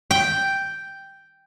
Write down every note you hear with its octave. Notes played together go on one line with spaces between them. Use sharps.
G5